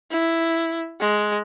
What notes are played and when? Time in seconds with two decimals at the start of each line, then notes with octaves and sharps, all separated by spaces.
0.11 E4
1.00 G#3